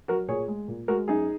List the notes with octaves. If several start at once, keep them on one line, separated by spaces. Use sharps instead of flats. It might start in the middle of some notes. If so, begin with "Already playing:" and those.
F#3 F#4 A#4
A#2 G#4 C#5
G#3
A#2
G#3 F#4 A#4
F#2 D#4 G#4